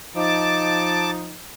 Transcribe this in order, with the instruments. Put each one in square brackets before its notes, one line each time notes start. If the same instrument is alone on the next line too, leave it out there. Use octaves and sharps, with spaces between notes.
[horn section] F3 D#4 [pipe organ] A5 D6